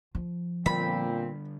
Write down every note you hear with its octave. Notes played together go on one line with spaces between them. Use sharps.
F3
A#2 D3 G3 B3 C4 B5